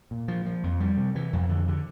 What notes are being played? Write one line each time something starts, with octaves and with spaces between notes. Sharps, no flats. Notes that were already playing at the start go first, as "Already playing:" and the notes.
A#2
F3
F3
F2
G3
C3
E3
F2
D3
D3